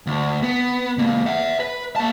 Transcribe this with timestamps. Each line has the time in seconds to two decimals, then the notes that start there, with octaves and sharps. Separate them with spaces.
0.07 D2
0.42 B3
0.98 C#2 A#3
1.26 E5 F#5
1.60 B4
1.96 A#3 A5